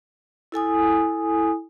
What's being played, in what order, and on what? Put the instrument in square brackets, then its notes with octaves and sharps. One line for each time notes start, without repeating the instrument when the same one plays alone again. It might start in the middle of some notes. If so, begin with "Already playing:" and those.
[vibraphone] E4 A4 G#5 D#6